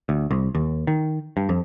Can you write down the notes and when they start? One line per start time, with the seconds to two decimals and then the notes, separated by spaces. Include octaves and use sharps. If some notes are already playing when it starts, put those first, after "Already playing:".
0.09 D2
0.31 C2
0.55 D#2
0.87 D#3
1.37 G2
1.49 F2